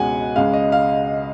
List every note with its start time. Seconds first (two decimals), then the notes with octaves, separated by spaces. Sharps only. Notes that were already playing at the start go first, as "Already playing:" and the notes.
Already playing: C#2 B2 G#3 C#4 F#5 G#5
0.36 C#2 C#3 G#3 F5
0.53 D#5
0.72 F5